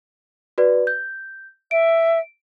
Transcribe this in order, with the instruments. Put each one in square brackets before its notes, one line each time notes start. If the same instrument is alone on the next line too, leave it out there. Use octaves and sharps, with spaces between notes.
[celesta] F#4 B4 D5
G6
[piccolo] E5 [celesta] D7